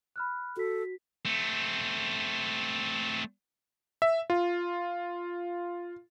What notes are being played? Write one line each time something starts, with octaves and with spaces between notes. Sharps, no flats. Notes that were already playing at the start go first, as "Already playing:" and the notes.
B5 F6 F#6
F#4 A4 B6
A3 C4
E5
F4